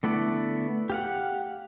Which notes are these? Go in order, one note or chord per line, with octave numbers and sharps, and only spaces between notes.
D3 A3 B3 E4 D5
G4 F5 F#5